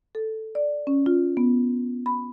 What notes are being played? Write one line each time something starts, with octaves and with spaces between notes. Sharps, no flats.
A4
D5
C#4
F4
B3
B5